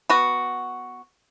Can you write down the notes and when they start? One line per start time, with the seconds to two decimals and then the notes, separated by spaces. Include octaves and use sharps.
0.10 B3 F#4